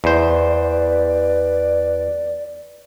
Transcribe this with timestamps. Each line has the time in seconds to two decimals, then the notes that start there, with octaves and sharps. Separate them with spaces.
0.04 E2 B4 C5 D5